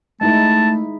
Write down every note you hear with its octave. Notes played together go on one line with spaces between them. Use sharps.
G#3 A3 D#4 E4 A5